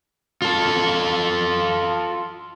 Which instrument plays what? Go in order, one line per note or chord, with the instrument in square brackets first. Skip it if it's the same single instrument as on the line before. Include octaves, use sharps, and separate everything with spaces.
[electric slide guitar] F4 A4